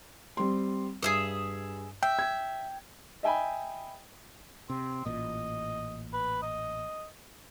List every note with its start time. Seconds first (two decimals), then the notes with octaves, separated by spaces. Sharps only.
0.37 G3 C4 C6
1.02 G2 G#4 E5 D#6
2.03 E5 G5
2.19 G#6
3.23 D#5 E5 G5 G#5 B5
4.70 C3 C4
5.06 A1 A#2 D#5
6.13 B4
6.42 D#5